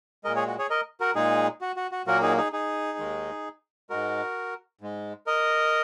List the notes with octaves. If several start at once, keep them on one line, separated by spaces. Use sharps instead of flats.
A#2 G#3 A#4 D#5
G#4 C#5
F#4
G#4 C#5
A#4 D#5
F#4 A#4
A#2 G#3 D#4 G#4
F#4
F#4
F#4
A#2 F#3 A#3 F#4 A#4
D#4 G#4
D#4 G#4
D#4 G#4
D#2 D#3 G#3
G#2 G#3 F#4 A#4
G#2 G#3
A#4 D#5